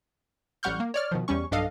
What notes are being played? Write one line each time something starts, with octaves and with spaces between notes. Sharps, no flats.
A1 G3 F#5 C#6 F6 G6
A#3
C#5 D5 F6
B2 D#3 F3
E2 G3 C#4 C#6
B1 G2 D4 A4 D#5 F5